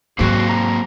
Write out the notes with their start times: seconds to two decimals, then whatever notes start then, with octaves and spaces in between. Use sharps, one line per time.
0.19 G#2 F#3 A#3 C4 F#4 G#4
0.48 A#5